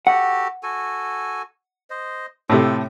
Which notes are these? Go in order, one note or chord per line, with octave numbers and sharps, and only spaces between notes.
F#4 G4 A4 F#5
F#4 A4 G#5
C5 D#5
A2 C3 A3 F4 A4